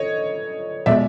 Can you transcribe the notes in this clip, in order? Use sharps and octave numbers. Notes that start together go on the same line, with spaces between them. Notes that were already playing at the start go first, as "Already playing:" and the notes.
Already playing: D3 C#5 D#5
B2 G#3 D5 E5